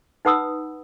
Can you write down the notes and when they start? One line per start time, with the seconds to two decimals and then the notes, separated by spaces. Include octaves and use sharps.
0.25 D#4 B4 F#5 B5 D#6 E6